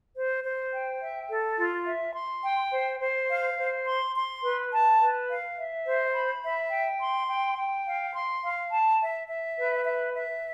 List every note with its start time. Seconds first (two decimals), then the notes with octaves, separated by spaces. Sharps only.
0.16 C5
0.44 C5
0.72 G5
1.01 E5
1.30 A4
1.58 F4
1.87 E5
2.15 C6
2.44 G5
2.72 C5
3.01 C5
3.29 F5
3.58 C5
3.87 C6
4.15 C6
4.43 B4
4.72 A5
5.00 B4
5.29 F5
5.57 E5
5.86 C5
6.14 B5
6.43 E5
6.72 G5
7.00 C6
7.29 G5
7.57 G5
7.85 F5
8.14 C6
8.43 F5
8.72 A5
9.00 E5
9.28 E5
9.57 B4
9.85 E5
10.14 E5